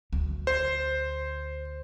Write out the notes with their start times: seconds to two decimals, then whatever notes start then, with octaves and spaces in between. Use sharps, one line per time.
0.13 D2
0.47 C5